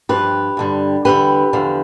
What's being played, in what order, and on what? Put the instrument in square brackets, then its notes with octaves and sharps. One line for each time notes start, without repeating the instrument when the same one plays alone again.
[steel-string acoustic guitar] G2 F3 G4 B4
G2 D3 G3
E2 D3 G3 G4 B4
E2 D3 F3